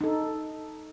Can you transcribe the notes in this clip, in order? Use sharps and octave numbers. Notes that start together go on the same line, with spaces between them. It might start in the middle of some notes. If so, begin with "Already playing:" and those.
D#4 A4